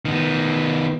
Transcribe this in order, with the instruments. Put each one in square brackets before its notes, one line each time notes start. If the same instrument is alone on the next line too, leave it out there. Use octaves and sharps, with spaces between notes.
[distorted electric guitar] D#3 B3